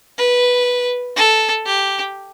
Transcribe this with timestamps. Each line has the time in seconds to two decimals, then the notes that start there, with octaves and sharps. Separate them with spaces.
0.18 B4
1.16 A4
1.66 G4